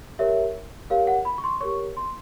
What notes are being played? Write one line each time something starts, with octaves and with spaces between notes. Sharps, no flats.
G4 A#4 C#5 E5
G4 A#4 C#5 F5
F#5
B5
C#6
C6
G4 A#4 C#5 C#6
C6